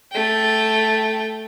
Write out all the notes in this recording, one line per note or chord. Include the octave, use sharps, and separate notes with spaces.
A3 G5